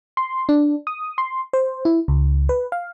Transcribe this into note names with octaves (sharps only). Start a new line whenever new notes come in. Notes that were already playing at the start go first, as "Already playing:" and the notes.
C6
D4
D#6
C6
C5
E4
C#2
B4
F5